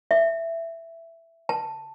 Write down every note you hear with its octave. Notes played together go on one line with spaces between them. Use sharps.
E5
A5